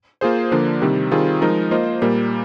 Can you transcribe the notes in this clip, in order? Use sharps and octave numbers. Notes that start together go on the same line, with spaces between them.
A#3 F4 G#4 C5
D3 F3 A#3 D4
C3 D#3 G3 C4
D#3 G3 C4 F4 G#4
F3 G#3 D#4 A#4 D#5
A#3 F4 C5 D#5
A#2 G3 A#3